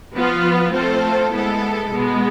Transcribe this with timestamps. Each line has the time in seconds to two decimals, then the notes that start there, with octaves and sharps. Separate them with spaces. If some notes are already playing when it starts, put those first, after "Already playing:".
0.16 F3 B3 F4 B4
0.74 A3 C4 F4 A4 C5
1.33 G#3 B3 E4 A4
1.91 B2 G#3 B3